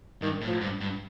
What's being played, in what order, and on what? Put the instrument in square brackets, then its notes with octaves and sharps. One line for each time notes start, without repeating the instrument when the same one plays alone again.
[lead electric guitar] G2 [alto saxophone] D#3
[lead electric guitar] A2
[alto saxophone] F3
[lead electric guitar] G2
G2